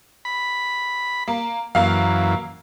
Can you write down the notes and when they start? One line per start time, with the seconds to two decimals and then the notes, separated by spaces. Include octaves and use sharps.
0.25 B5
1.28 A#3
1.75 F#2 E3 A#3 F5